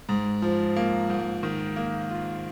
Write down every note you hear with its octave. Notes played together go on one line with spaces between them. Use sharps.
G#2
F3
A#3
G#2
D#3
A#3
F4